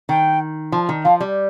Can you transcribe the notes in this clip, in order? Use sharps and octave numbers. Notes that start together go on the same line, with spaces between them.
D#3 G5
F3
D#3
F3 F5
G3